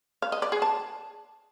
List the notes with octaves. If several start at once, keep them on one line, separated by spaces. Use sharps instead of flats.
F5
D#5
D5
G#4
A5